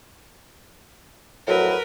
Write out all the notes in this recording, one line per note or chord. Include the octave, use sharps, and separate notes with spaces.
F2 A2 F#3 A#4 B4